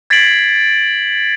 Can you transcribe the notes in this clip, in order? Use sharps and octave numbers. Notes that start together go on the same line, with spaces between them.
G#6 A6 B6 C7 D7 F#7